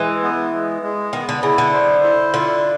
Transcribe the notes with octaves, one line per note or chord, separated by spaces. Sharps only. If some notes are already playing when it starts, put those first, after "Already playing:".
Already playing: E3 G#3
B3
G#3
G#3
D#3 B3
D3
C#3 E4
D3
C5
E4
D3 F4